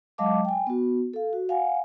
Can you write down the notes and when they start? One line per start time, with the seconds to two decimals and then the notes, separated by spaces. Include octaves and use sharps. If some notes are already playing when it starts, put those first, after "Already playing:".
0.18 F#3 G#3 D#5 F5 A5 D6
0.45 G5 G#5
0.67 B3 F#4
1.14 A4 F5
1.33 F#4
1.49 F5 F#5 G#5